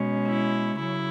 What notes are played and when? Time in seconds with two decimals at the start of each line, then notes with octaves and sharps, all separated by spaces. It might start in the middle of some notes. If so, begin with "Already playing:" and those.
Already playing: B2 G#3 C#4
0.27 E4
0.78 C#3 F#3 E4